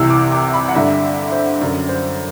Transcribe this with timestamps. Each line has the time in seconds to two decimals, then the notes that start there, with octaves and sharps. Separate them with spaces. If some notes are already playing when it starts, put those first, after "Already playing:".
Already playing: C2 C3 E3 E6
0.10 D6
0.32 D6
0.54 B5
0.69 F#5
0.75 G2 D3 E5
1.32 C5
1.61 F#2 D3
1.89 C5